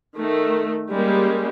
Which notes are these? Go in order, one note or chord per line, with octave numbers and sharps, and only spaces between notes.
D#3 A3
G3 G#3 A#3 C#4